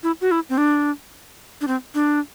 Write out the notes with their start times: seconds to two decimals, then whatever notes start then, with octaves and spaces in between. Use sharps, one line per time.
0.03 E4
0.21 F#4
0.31 E4
0.50 C4
0.58 D4
1.61 D4
1.68 C4
1.95 D4